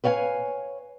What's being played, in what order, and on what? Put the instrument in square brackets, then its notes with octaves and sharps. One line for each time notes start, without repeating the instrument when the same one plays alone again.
[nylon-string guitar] B4 C#5 F5 G5 G#5